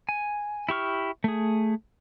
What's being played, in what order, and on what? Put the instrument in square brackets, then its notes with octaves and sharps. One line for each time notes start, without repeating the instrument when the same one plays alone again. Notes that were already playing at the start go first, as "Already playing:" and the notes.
[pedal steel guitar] G#5
E4 G4 C#6 F6
A3 G#4